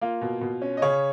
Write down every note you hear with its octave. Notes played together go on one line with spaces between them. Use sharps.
A#3 F4
B2
B2
C#4
D#5
C#3 C#5